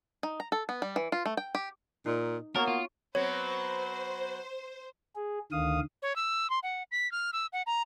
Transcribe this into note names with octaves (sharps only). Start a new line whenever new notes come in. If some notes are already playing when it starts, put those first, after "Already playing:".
D#4
A#5
A4
B3
G3
E3
F4
A3
G5
G4
A#2 D#4
A#3 B3 F#4 A#4 C#5 A5
F4
F#3 B3 C4 C5 C#5
G#4
D2 D3 D#3 F5 D#6
C#5
E6
C6
F#5
B6
F6
E6
F#5
A#5